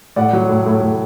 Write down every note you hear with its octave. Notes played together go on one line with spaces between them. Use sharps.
A2 D5 F#5
F#3
A2
A2
A2